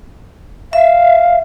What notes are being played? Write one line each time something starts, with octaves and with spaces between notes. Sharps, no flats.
E5 F5